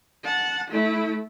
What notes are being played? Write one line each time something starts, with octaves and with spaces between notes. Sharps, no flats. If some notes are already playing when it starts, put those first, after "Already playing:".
F#5 A5
A3 E4